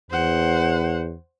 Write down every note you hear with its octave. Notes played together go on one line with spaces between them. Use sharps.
E2 C5 F#5